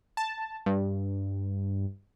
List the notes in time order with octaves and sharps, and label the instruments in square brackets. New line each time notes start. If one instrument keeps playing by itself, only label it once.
[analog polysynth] A5
G2